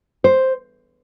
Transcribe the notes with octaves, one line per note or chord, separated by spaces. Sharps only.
C5